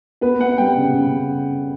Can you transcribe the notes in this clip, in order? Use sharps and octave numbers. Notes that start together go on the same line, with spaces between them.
B3 B4
B3 F#5
G3 G5
C#3
C#3